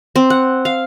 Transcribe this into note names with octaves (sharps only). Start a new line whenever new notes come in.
C4
F#5
F5